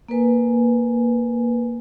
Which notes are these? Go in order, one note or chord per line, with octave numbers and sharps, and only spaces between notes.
A#3 A#4 B4 G#5